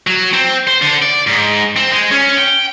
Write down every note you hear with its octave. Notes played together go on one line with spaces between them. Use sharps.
F#3
C4
C5
D3
D5
G#2
C4
G#3
C#4
G5